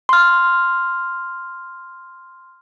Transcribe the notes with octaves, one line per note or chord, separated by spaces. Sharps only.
C6 F6